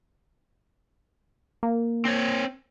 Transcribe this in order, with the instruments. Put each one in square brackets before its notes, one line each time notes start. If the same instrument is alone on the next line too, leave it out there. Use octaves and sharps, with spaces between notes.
[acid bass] A#3
[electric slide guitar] C4 C5 C#5